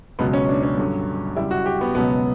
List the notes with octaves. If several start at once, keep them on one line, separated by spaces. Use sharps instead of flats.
C#2 B2 F#3 B3
C#4
D4
C#4
G2 D3 F#3
F#2 C#3 G3 E4
F#4
G4
B3
C#2 B2 F#3 B3